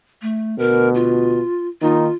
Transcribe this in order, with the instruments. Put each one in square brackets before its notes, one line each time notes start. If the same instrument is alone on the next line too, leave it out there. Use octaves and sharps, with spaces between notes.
[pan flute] A3
[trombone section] D2 B2 [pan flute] A#4
[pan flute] F4
[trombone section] D#3 A#3 D#4 [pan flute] F4